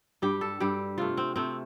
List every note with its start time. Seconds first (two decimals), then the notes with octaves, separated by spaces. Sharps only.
0.22 G2 G3 G4
0.41 A4
0.60 G2 G3 G4
0.98 C3 A3 F4
1.17 C4
1.36 C3 A3 C4